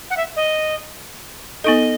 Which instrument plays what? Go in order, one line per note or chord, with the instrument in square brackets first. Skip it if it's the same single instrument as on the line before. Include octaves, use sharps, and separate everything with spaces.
[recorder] F#5
E5
D#5
[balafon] B3 D#4 A4 [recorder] D#5